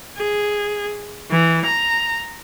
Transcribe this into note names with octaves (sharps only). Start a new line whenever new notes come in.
G#4
E3
A#5